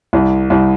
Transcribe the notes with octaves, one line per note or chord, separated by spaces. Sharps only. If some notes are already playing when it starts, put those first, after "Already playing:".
C2
C2